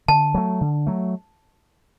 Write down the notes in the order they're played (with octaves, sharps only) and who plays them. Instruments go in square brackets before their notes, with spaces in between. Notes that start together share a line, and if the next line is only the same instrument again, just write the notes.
[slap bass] D3 [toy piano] A5
[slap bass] F#3 A3
D3
F#3 A3